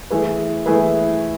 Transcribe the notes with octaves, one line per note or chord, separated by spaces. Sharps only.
E3 A3 E4 G#4 B4
E3 A3 E4 G#4 B4